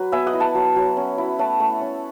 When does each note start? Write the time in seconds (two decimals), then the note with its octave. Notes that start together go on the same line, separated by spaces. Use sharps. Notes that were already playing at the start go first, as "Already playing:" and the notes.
Already playing: F#3 B4
0.12 B3 E5 G#5
0.27 D#5 F#5
0.33 E4
0.40 F#5 A5
0.55 F#3
0.76 F#3
0.97 C#4
1.18 E4
1.39 A3 F#5 A5
1.60 A3
1.81 C#4